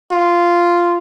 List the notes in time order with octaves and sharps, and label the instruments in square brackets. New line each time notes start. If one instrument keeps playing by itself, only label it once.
[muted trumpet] F4